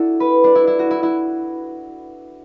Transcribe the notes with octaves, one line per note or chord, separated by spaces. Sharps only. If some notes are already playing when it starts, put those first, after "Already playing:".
Already playing: D4 E4 F#4 A4
B4
D4
E4
E4
F#4
E4
E4